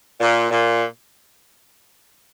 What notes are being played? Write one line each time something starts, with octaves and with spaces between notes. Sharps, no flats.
A#2
A#2